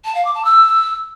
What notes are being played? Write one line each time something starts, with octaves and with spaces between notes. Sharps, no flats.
A5
F5
D6
A5
E6